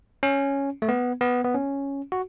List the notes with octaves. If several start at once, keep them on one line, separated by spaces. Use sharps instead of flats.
C#4
A3
B3
B3
B3
C#4
F#4